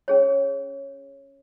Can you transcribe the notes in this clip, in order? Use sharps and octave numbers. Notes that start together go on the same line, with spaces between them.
C#4 G#4 C#5